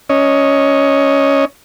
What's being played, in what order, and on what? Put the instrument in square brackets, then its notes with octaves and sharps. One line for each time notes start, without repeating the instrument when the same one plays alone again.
[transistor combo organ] C#4 C#5 D#5